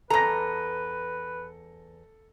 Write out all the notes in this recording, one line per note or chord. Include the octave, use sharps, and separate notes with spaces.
E2 A4 B4 A#5 A#6